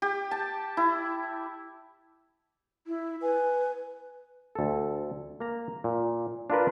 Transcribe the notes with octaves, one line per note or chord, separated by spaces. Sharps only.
G4
A5
E4
E4
B4 G#5
D2 A4
A#3 A#5
A#2
D4 F4 A#4 B4